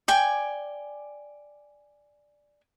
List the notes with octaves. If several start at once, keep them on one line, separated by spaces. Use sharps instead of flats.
D5 G5 G#5